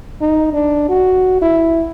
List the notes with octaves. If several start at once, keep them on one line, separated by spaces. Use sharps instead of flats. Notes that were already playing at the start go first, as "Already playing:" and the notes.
D#4
D4
F#4
E4